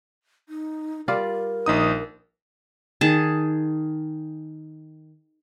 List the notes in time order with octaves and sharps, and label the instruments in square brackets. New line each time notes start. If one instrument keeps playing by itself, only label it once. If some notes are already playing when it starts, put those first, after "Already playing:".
[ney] D#4
[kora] G3 F4 D5 [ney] A#4
[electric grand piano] A#1 D#4 D#6
[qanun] D#3 G#4 A5